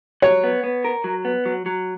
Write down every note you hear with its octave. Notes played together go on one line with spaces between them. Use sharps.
F#3 C#5
B3
B3
A#4
F#3
B3
F#3
F#3